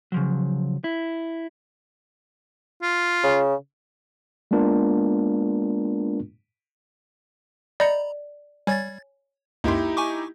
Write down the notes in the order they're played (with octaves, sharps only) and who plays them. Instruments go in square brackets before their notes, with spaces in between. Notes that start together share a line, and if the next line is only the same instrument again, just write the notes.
[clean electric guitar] C#3 F3 F#3
E4
[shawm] F4
[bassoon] C#3
[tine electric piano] G#3 A#3 B3 D4 F4 A#4
[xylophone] D5 [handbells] D#5 G6 C#7 [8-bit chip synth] A#5 B5
[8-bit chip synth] G3 G#6 A6 [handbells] C#5 G#5
[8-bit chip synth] C#2 F#2 [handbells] A#3 C6 [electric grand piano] D#4 E4 G4
[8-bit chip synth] G#5 C#6 D6